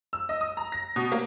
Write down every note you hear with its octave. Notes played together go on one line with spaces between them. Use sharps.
E6
D#5
D#6
A#5
A#6
B2
A#3